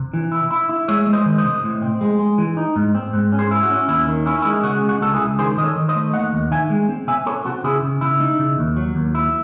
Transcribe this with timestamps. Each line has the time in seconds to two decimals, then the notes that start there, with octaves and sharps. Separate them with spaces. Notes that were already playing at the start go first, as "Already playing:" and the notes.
Already playing: C3
0.14 E3
0.32 E4
0.51 E4
0.69 E4
0.88 G#3 C#5 E5
1.07 G#3
1.13 C5 D#5
1.26 D#3
1.38 C5 D#5
1.44 C3
1.63 A2
1.82 C4
2.01 G#3
2.19 G#3
2.38 E3
2.57 D#4
2.76 G#2
2.95 C4
3.13 G#2
3.32 C#4
3.38 G#4 C5
3.51 E4
3.63 F#4
3.70 C#4
3.88 D#2 E4
4.07 D#3
4.26 C#4 E4
4.42 E4
4.45 G#3
4.63 C#3 F#4
4.82 C#2
4.89 F#4
5.01 C#2 A4
5.13 E4 G#4
5.20 C#2
5.39 D#3 G#4 C5
5.57 D#3 D#5
5.63 A4 C#5
5.76 D#3
5.88 C5 D#5
5.95 A3
6.14 D#2 D#5 F#5
6.32 D#2
6.51 D#3 E5 G#5
6.70 G#3
6.89 C4
7.07 C3 E5 G#5
7.26 C3 A4 C#5
7.45 C4 F#4 A4
7.64 C#3 E4 G#4
7.83 C#3
8.01 C#3 E4
8.20 D#4
8.39 C#3
8.58 D#2
8.77 F#3
8.95 D#2
9.15 E4